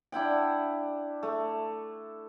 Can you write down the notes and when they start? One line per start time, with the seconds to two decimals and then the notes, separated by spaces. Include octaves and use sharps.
0.12 D4 E4 F#5 G5
1.23 A3